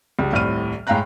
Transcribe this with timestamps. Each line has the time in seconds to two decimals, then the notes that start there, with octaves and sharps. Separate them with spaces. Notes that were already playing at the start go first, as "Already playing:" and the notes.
0.19 C#2 G3
0.32 D#1 C2 A2 C3 F6 D#7
0.87 A2 G#3 F5 G5 A#5 F#6